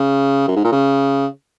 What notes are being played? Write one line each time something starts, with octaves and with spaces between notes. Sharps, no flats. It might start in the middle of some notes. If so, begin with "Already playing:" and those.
Already playing: C#3
F#2
G#2
A#2
C#3